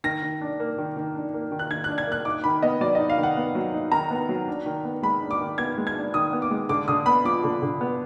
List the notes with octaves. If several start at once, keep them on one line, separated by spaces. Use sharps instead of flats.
D#3 A#6
D#3
D4
A#3
D#3
D#3
D4
A#3
D#3
F#6
D#3 G#6
D4 F#6
G#6
A#3 F#6
D#4 D6
D#3 B5
B3 D#5
F#3 D5
D#4 D#5
F5
D#3
F#5
B3
F#3
D#4
D#3 A#5
B3
F#3
D4
D#3
B3
G#3 B5
D4
D6
D#3
B3 G#6
G#3
G#6
D4
D#3 D#6
B3
D6
G#3
D3 D6
D3 D#6
B3 B5
F3 D6
D3
D3
B3